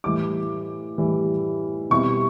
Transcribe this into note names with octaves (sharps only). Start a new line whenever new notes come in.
A2 E3 G3 D6
A2 E3 G3
B2 G3 C4 E4 C#6